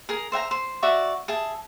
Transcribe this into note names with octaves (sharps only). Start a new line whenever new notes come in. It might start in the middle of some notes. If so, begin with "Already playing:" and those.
G#4 A#4
C5 E5 G5 A#5
C5
F#4 D5 E5 C#6
G#4 E5 A5